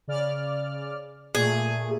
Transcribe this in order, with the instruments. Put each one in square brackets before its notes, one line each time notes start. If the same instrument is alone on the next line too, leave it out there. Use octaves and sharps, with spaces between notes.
[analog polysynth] C#3 D5 F6
[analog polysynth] A#2 A3 [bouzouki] G#4